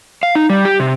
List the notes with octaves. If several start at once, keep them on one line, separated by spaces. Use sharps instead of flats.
F5
D#4
G3
G4
C3